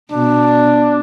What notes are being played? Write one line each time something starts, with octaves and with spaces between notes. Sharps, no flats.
B2 D4